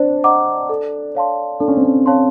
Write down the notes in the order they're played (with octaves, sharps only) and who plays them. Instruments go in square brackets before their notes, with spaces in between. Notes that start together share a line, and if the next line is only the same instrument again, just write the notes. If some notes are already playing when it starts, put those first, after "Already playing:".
Already playing: [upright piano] D4 [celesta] C5
[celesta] D#5 F#5 A#5 D6
A4
C#5 F5 A5 C6
[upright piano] D4 [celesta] A4
[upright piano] C#4
C4
C#4
[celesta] C#5 F5 A5 C6